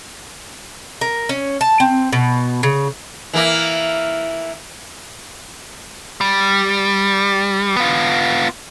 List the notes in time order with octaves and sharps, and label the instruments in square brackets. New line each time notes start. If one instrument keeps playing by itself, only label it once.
[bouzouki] A#4
C#4
A5
C4
B2
C#3
[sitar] E3 A#3
[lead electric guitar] G3
B3 F4